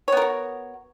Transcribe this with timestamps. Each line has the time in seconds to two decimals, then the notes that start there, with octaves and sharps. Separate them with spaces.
0.08 C#5
0.12 B3
0.17 A#4
0.22 F#4